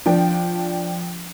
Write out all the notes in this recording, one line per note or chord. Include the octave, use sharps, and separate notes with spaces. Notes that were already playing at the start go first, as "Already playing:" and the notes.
F3 D4 G5